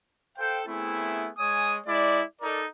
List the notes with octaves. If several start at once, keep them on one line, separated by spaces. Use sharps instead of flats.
A4 C5 F5 G5
A3 B3 C4 E4 G#4
G#3 C#5 G#5 D#6
G#3 E4 D5
D#4 A4 A#4 D5 D#5